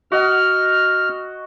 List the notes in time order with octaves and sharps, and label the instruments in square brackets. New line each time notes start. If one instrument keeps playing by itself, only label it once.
[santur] F#4 D#5 F#5 [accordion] F6